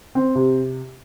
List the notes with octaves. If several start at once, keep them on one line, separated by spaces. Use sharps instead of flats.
C4
C3